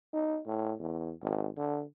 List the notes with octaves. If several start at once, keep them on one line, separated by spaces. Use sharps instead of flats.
D#4
A2
E2
G#1
D3